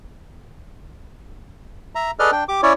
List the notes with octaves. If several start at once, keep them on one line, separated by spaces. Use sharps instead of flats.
E5 A#5
G#4 A4 B4 D5 D#5 F6
D4 G5
G4 D6
C#4 E4 C#5 D5